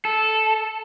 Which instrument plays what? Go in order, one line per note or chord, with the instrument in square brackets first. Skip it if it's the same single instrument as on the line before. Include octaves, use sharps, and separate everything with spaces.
[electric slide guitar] A4